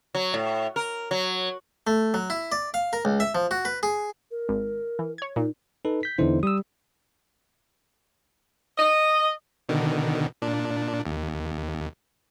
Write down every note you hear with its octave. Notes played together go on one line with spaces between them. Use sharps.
F#3
A2
A#4
F#3
A3
F#3
E4
D5
F5
A#4
C#2
E5
F3
F#4
B4
G#4
A#4
G#1
E3
C#5 G#6
A#2 D#4
D#4 A4 B4
G6 B6
E2 D3 E3 D#4 E4 C5
G3 D#6 E6
D#5
B2 D3 D#3
A#2 D4
D#2